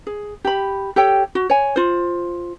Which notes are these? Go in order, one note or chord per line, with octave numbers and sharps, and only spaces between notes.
G#4
G4 B5
G4 A4 C#5 G5
F#4
C#5 G#5
F4 C5